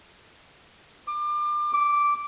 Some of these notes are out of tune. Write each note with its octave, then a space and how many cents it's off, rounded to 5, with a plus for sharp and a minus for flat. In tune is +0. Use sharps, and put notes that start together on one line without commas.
D6 +30
D6 -5